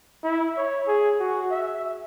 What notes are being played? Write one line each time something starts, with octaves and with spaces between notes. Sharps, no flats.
E4
C#5
G#4
F#4
E5